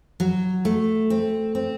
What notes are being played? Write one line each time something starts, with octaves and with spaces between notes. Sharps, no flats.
F#3
A3
C4
C4